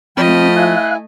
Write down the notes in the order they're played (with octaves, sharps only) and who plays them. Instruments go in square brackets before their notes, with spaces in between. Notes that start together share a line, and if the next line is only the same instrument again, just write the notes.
[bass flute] F3 [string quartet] A3 D#5 [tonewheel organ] C4 [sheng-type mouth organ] G5 B5 F6
[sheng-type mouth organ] E4 G#5 [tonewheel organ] F5 F#6